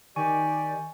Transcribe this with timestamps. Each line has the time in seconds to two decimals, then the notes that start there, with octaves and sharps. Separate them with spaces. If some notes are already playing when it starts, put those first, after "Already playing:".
0.16 D#3 G4 D5 G#5 C#6